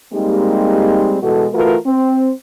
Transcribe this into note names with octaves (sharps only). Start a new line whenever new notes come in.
G3 G#3 A#3 C4 D#4 G4
B2 E3 G#3 F#4 A4
E3 A3 F4 F#4 A#4 B4
C4